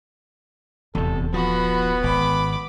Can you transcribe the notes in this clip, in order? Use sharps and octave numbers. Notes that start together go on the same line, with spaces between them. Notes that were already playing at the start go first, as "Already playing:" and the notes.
D#1 A#1 E2 C3 A4
F3 B3 F#4 B5
G#1 B5 D6